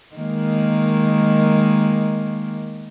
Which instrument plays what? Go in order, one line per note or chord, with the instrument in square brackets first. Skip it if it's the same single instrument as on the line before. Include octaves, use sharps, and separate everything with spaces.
[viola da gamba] D#3 G#3 A#3